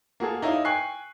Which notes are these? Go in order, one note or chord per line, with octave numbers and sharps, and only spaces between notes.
A#3 F#4 G#4 A4
D#4 E4 C#5 D#5 F5
G5 G#5 C#6 F#6 C7